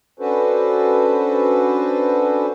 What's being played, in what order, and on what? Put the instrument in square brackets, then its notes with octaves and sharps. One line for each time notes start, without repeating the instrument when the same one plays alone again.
[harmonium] C#4 D4 F#4 A4 B4 C5